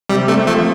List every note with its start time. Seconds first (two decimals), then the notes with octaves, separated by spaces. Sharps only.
0.10 C3 G3
0.28 A3 C4
0.47 F3 A3